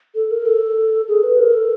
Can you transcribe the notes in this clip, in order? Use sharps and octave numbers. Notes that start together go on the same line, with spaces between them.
A4
A#4
A4
G#4
B4
A#4
A4